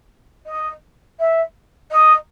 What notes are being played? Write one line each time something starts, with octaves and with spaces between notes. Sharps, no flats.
D#5
E5
D#5